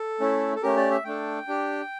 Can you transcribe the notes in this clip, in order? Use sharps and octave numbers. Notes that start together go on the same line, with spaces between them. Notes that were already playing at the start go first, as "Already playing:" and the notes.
Already playing: A4
A3 C#4 E4
A4
A3 C#4 G4 A#4
D5
E5
A3 D4 A4 G5
D4 G4